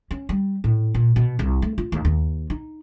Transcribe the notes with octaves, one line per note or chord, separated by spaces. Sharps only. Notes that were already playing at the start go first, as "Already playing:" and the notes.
C#4
G3
A2
A#2
B2
C2
A3
F4
D#2
D#2
D#4